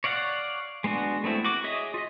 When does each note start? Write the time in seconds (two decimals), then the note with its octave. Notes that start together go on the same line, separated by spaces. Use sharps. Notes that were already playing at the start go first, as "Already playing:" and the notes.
0.04 C#5 D5 F5 F#5
0.84 G#3 B3 D4 F#4
1.24 A3 B3 C4 E4
1.44 F#4 D6
1.64 G#4 C#5 D#5 E5 D#6
1.94 F4 D#5